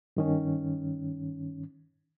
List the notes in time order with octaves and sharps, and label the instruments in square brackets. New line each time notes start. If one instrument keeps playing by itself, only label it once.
[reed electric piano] G2 D#3 C#4